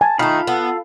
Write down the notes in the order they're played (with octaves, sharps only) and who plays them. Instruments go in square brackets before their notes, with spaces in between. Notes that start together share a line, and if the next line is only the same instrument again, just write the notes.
[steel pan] G#5 [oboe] A5
[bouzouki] D#3 A3 [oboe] D#4 [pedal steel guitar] F4 F5 B5
[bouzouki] B3 [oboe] A4